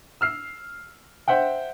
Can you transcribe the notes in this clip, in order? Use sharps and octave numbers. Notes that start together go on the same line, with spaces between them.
E6 F6 C7
C5 E5 F#5 G5